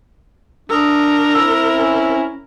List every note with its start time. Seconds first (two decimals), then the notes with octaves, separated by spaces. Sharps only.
0.70 D4 A#4 D#6 E6
1.34 C4 E4 E6
1.70 C#4